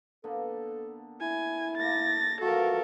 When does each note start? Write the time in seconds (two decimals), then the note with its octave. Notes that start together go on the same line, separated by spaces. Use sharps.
0.24 D3 A#3 B3 A4
1.21 E4 G#5
1.77 A3 A#3 A6 A#6
2.41 G2 E3 F3 F#4 A4 A#4